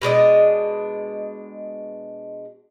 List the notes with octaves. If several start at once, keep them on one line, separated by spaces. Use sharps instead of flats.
B2 G#3 D4 D#5